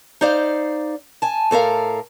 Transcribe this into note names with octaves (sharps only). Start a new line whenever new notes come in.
D#4 C5 D5 F5
G#5 A5
A2 A4 A#4 F5